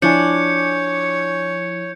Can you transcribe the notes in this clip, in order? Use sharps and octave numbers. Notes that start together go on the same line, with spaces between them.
F3 D4 E4 C#5 G#5 G6 C#7